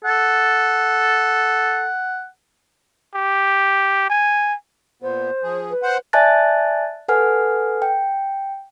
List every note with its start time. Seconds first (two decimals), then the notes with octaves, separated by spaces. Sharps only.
0.05 A4 F#5
3.15 G4
4.10 G#5
5.02 A#2 B3 C5
5.43 F3 G#4
5.70 B4
5.83 C5 F#5
6.13 D5 E5 G#5 A5 F#6 A6
7.08 A4 B4 F#5 G#5 F6
7.82 G5